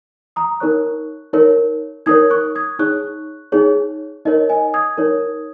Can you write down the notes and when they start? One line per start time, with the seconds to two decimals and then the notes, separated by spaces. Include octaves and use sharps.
0.36 A#5 D#6
0.60 D#4 A#4 C#5 C#6 F#6
1.33 D#4 A#4 C#5
2.06 D#4 A#4 C#5 D#6 G#6
2.30 C#6 F#6
2.55 D#6 G#6
2.79 D#4 G#4 C#5 C#6 F#6
3.52 D#4 G#4 C#5
4.25 D#4 A#4 C#5 D#5
4.49 D#5 G#5
4.74 D#6 G#6
4.98 D#4 A#4 C#5